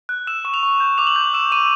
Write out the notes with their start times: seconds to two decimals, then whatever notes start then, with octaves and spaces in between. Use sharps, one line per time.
0.09 F#6
0.27 E6 E7
0.45 C#6 E7
0.54 F7
0.63 C#6
0.80 G6
0.98 D6 F7
1.07 F#7
1.16 G6
1.34 E6 E7
1.52 C#6 D#7